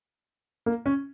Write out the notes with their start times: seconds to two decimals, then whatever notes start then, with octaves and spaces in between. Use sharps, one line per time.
0.66 A#3
0.86 C#4